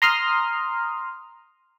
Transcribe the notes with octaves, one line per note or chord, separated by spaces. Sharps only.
A#5 C6 D#6 F6